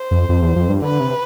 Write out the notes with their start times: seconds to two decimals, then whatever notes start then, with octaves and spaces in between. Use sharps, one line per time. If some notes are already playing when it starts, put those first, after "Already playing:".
Already playing: C5
0.11 F2
0.29 F2
0.42 E2
0.56 F2
0.69 G2
0.82 D3 B4
1.00 C3